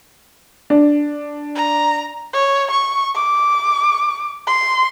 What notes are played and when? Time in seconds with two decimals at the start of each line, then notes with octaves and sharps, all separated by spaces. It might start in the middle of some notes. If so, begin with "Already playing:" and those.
0.70 D4
1.55 A#5
2.33 C#5
2.71 C#6
3.15 D6
4.47 C6